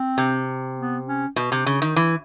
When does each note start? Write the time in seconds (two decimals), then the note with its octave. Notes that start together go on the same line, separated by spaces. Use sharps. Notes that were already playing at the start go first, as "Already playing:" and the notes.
Already playing: C4
0.18 C3
0.77 B3
1.07 C#4
1.36 B2
1.52 C3
1.66 C#3
1.82 D#3
1.96 E3